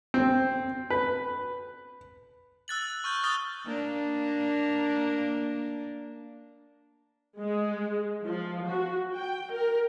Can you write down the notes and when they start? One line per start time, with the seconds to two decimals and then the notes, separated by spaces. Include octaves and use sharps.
0.14 C4
0.90 B4
2.68 E6 F#6 A6 F#7
3.04 C#6 F6 G6
3.23 D#6 F6 G6 A6 G7
3.65 A#3 D4
7.41 G#3
8.25 F3
8.67 F#4
9.15 G5
9.52 A#4